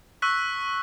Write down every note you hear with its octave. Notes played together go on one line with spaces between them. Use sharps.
C#6 E6 F#6 B6